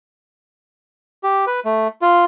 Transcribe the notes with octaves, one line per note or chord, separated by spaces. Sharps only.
G4
B4
A3
F4